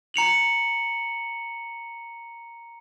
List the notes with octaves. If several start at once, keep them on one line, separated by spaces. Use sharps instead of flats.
A#5 C#7 F7 F#7